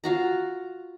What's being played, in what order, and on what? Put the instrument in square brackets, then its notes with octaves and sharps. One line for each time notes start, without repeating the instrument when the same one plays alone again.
[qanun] F4 F#4 A#5